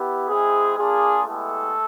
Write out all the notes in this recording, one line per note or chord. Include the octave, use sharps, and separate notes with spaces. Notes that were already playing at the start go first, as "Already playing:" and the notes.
Already playing: B3 E4 G4
G#3 C4 E4 G#4
A#3 D4 F4 G#4
G#3 A3 B3 E4 G4 A4